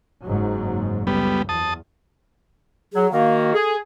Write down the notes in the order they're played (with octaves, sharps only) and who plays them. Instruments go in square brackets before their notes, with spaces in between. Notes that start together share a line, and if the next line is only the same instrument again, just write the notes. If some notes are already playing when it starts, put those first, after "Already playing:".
[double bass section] F#1 G#2 F#3
[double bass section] C#2 [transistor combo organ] G3 B3
[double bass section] E2 [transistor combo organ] A5 D#6
[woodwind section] F#3 [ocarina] G#4
[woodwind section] D#3 A#3 F#4 [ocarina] F5
[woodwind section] G#4 [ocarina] A4